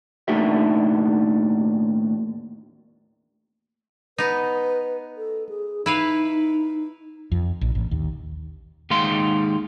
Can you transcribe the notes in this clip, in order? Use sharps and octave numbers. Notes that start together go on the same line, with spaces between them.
D#2 A2 D#3 D4 F#4 E5
B3 D#4 B4
A4
G#4
D#4 E4 B4 F5
F2
A#1
A1
D#2
D#2 G#3 D#4 F5 C6